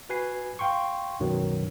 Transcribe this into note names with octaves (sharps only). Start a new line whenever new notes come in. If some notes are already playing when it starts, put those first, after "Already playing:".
F#4 B4 G#5 C7
F5 G5 C6 C#6
C2 F#2 B2 D#3 F#3